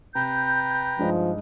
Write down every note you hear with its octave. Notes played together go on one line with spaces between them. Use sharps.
C3 B4 G5 A#5 G6
G2 F3 G#3 D#4